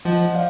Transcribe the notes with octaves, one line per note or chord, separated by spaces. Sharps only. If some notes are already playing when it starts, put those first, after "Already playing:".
F3 D#5 F#5
D5 F5